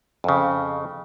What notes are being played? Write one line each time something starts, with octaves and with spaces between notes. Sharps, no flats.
F2 C#3